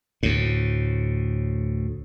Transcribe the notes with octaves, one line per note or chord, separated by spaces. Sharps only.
D2 A2